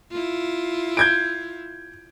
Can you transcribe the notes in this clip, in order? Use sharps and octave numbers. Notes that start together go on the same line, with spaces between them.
E4 F4
G6 G#6 D7